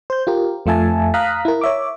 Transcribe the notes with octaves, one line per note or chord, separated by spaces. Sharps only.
C5 G6
F4 G4 A#4
F2 A3 F4 E5 G#5 A5
F5 A#5 D#6 F#6 B6
E4 A#4
C#5 E5 D6